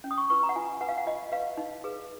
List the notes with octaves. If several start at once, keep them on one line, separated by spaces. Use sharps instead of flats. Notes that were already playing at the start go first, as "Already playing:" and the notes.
C#4
D#6
C#6
F4 B4 C#6
A#5
F#5
F4 G#5
B4 F#5
F5
F#5
F4 D#5
B4 F5
D#4
G#4 B4